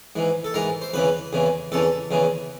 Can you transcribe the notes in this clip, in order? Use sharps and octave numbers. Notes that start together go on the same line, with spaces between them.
G#2 E3
A4
G#2 E3 A#4
C5
E2 C#3 E3 B4
E2 C#3 E3
E2 C#3 E3 A4
E2 C#3 E3